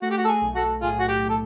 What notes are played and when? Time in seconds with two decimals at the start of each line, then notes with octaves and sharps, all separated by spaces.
0.02 A3 F#4
0.10 G4
0.18 F#4
0.25 A4
0.28 G#4
0.42 B1
0.55 F#4 A4
0.82 A2 F4 G#4
0.99 F#4
1.08 G4
1.22 A2
1.29 A4